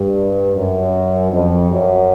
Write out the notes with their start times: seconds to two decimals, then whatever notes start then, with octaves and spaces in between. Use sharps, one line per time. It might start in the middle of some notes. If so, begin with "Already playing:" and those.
Already playing: G2
0.55 F#2
1.32 F2
1.71 F#2